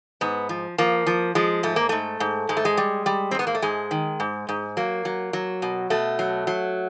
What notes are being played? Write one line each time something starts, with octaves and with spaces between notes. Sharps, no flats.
G#2 B3
F3
F3 A#3
F3
F3 G#3
G#2 A3
A#3
G#2 A3
G#2
G#2 G#3
A3
G#3
G3
G3
C4
G#2 B3
A#3
A3
G#2 G#3
D#3
G#2
G#2
F#3 A#3
F#3
F#3
B2
B2 A3
F#3
F#3